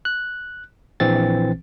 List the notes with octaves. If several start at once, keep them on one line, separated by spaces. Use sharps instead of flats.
F#6
A#1 E3 C4 A6